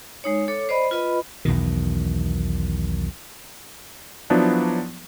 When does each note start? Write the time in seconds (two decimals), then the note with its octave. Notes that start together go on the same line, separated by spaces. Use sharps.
0.24 G#3 D#4 C#5
0.48 A4 C#5 D6
0.69 C5 D5 D#5 B5
0.91 F4 B4 D#5 B5
1.45 B1 E2 B2 D#3
4.30 F3 F#3 B3 D4 E4